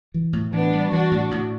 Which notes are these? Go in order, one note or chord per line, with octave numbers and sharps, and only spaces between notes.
E3
A2
E3 B3 D4
G3
E3 D4 F#4
A2
A2